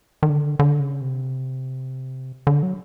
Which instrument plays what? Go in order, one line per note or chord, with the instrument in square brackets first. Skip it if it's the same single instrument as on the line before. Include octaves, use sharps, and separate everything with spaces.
[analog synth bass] D#3
D3
D3
C#3
C3
D3
F#3